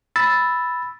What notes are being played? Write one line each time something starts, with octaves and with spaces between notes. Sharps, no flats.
B5 E6 A6